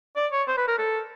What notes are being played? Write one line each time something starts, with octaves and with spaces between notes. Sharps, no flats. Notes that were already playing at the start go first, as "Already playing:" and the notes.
D5
C#5
C5
B4
A#4
A4